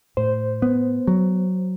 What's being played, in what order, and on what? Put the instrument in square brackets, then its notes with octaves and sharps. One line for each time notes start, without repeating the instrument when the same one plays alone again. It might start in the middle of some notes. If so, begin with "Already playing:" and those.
[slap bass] A2 [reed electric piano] C5
[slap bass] B3
F#3